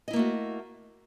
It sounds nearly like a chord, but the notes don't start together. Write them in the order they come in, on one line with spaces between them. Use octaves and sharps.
D#5 E4 A#3 A3 F#4